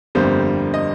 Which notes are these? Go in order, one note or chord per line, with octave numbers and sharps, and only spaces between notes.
G1 F2 D3 G3 A#3 C5
D#5